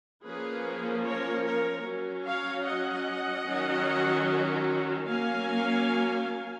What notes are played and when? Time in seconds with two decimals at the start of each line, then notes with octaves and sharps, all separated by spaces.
0.25 F3 A#3 C#4 G#4 B4
1.05 A#4 C#5
1.45 A#4 C#5
1.86 F#3 C#4
2.26 C#5 F5
2.66 D#5 F#5
3.46 D#3 F#3 C#4
5.07 F#3 A#3 C#4 F5 G#5